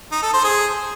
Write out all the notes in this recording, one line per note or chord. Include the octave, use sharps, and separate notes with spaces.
D#4
A4
C5
G#4